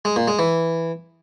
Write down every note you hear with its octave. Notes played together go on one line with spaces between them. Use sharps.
G#3
A#2
G#3
E3